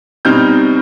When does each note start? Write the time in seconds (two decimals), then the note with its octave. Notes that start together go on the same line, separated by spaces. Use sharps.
0.25 B2 G3 C4 D#4 F6 G6